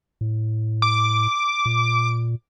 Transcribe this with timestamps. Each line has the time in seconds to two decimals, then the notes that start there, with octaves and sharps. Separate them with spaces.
0.21 A2
0.82 D6
1.66 A#2